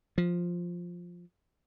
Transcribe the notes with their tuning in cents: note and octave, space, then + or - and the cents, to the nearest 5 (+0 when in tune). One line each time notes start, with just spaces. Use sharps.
F3 +5